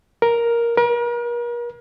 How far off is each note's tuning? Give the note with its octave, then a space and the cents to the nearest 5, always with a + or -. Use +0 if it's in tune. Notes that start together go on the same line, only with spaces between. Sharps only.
A#4 +5
A#4 +40